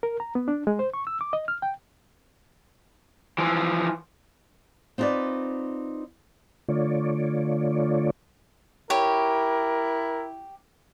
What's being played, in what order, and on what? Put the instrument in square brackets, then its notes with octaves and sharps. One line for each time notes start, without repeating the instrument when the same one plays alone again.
[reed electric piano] A#4
A#5
B3
D4
G#3
C5
C#6
E6
D6
D#5
F6
G5
[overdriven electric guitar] E3 F3
[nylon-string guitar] C4 D#4 F4 A4 B4 D5
[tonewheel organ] D3 A3 F4 C#5 D5
[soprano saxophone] E4 [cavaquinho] G4 C#5 [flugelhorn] A#4